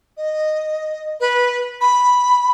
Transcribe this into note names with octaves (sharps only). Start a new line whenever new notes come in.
D#5
B4
B5